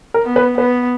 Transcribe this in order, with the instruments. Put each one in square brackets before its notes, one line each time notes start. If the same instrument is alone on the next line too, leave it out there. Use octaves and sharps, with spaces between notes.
[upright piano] A#4
[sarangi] B3
[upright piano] B4
[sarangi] B3 [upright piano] B4